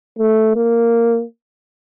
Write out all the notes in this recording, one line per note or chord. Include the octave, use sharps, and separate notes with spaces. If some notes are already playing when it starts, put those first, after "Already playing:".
A3
A#3